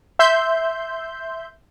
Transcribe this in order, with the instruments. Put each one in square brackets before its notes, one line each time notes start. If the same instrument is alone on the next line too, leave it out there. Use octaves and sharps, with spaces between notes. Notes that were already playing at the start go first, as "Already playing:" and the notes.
[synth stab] E5 C6 G6